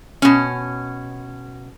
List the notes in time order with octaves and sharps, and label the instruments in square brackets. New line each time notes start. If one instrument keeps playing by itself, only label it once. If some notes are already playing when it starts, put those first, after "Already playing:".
[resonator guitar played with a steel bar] B2 C#4